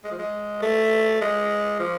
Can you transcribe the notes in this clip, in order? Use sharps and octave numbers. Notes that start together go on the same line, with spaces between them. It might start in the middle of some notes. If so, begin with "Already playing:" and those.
G#3
F3
G#3
A3
G#3
F3